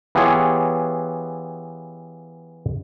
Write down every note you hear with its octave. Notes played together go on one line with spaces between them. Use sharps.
E3 B3 F4 G4 G#4 C#5